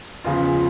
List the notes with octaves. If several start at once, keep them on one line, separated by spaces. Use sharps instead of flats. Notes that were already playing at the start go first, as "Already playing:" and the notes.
E2 C#3 F3 F4